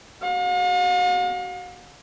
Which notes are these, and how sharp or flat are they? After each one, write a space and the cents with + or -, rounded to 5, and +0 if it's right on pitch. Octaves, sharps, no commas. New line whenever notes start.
F#4 +35 F5 +45